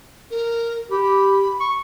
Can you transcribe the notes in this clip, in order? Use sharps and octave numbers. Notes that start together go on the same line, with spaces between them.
A#4
G4 B5
C#6